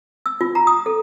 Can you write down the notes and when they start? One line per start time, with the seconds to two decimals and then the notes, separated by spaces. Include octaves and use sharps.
0.26 E6
0.41 F4
0.55 A#5
0.67 D#6
0.86 A4